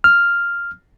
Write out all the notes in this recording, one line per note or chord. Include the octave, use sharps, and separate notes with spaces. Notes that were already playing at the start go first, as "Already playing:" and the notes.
F6